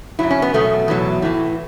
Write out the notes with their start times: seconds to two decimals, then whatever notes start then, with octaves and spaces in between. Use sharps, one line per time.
0.19 F#2 F#3 E4
0.31 C#4
0.42 B3
0.54 E2 B2 F#3 A3
0.88 E2 B2 F#3
1.22 A2 E3